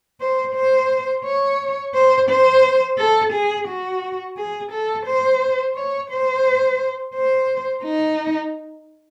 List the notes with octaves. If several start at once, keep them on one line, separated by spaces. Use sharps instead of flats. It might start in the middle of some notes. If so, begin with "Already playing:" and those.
C5
C5
C#5
C5
C5
A4
G#4
F#4
G#4
A4
C5
C#5
C5
C5
D#4